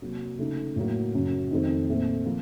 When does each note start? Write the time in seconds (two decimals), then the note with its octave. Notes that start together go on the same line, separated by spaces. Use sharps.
0.02 C3 F#3 A#3
0.39 C#3 A3 D#4
0.76 A2 F#3 A#3
1.14 F#2 C#3 F#3
1.51 F2 D#3 A3 C4
1.89 A#2 A3 C4
2.26 F3 A#3 F4